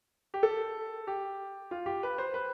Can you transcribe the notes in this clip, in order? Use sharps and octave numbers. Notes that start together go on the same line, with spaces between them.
G4
A4
G4
F4
G4
B4
C5
B4